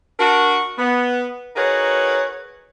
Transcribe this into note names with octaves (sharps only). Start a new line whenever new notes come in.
D4 F#4 A#4
B3
D#4 F#4 G#4 A#4 B4 C#5